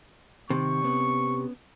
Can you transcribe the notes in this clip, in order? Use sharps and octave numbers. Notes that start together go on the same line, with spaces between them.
C3 D#3 C#6
B3 C#4